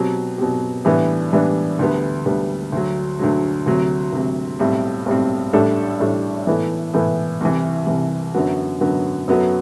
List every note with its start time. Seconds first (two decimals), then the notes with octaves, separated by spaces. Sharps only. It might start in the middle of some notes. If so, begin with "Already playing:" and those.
Already playing: B2 F#3 C4 G4
0.38 B2 F#3 C4 G4
0.85 A2 E3 G3 B3 D4
1.32 A2 E3 G3 B3 D4
1.79 D2 D3 G3 B3
2.26 D2 D3 G3 B3
2.72 D2 D3 F#3
3.19 D2 D3 F#3
3.66 D2 C3 F#3
4.12 D2 C3 F#3
4.59 B1 A2 G3 C4
5.06 B1 A2 G3 C4
5.53 A1 A2 G3 D4 A4
6.00 A1 A2 G3 D4 A4
6.47 A2 E3 B3 E4 A4
6.94 A2 E3 B3 E4 A4
7.41 C2 C3 E3
7.87 C2 C3 E3
8.34 F#2 D3 F#3 B3 F#4
8.81 F#2 D3 F#3 B3 F#4
9.28 F#2 F#3 B3 F#4 A4